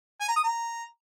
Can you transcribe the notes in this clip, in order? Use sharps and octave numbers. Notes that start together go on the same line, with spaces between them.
G#5
A#5
D#6
A#5